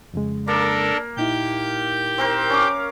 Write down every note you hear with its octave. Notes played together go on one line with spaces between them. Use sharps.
F2 C#3 G#3
A#3 D4 A4 A#4
A#2 D#4 E4 G4 G6
C4 A#4 C5
C#4 F5 D6